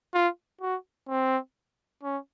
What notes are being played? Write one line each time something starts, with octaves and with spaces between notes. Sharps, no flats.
F4
F#4
C4
C#4